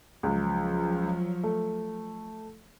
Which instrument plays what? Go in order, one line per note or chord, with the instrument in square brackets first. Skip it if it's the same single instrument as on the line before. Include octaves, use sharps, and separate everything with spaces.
[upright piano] C#2 [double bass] F3 F#3
[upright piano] A3